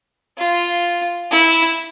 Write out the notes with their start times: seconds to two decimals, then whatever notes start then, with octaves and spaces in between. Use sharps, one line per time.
0.38 F4
1.31 E4